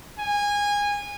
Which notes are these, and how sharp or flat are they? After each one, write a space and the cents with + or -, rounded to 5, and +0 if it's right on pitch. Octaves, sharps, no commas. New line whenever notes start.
G#5 -20